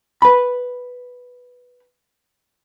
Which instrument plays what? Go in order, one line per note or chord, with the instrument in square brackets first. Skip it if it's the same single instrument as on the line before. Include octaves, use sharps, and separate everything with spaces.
[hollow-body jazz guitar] B4 B5